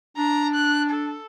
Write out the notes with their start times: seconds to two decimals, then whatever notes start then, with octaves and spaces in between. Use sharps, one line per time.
0.17 D4 A#5
0.54 F#6
0.90 A4